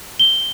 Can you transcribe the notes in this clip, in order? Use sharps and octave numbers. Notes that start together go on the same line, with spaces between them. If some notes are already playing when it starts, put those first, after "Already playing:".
G7